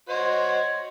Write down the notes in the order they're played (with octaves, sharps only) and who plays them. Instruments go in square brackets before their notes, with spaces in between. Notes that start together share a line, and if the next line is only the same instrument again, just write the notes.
[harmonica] F#4 C5 [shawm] C#5 [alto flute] D#5 [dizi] C6